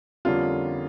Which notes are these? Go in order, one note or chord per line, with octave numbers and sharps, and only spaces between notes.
F2 D3 G3 A#3 C#4 F4